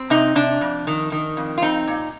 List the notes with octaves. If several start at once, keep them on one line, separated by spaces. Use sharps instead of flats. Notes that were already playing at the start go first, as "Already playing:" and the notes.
Already playing: C4
C3 D#4
C3 D4
F2
D#3
D#3
F2
F4
C4 D#4
A#2